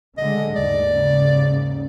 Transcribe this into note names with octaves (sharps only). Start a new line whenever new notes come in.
D3 G#3 A3 D#5
D#2 G#2 D5
C#3